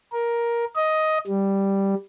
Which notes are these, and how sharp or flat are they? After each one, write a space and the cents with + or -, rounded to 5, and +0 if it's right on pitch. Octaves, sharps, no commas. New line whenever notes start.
A#4 +10
D#5 +10
G3 +0